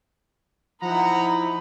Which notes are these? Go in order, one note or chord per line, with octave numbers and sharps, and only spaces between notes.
F3 D#4 E4 F#5 A#5 B5